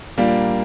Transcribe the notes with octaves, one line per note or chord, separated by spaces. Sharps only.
A#2 G3 A#3 D4